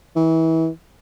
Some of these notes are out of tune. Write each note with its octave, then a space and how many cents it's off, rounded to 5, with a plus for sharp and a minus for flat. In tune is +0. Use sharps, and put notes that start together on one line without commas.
E3 -30